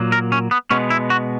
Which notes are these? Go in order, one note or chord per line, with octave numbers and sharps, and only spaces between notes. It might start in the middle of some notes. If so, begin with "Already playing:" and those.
Already playing: A#2 F#3 A#3
A#4
C#4
B3
B2 G#3 B3 C#4
E4
F#4